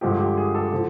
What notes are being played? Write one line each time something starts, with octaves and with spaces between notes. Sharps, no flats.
G2 D3 F3 G#3 G4
G4
G#4
A4
D3 F3